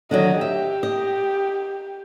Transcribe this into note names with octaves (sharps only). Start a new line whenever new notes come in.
D3 D#3 F#3 D#5
G4 E5
D#5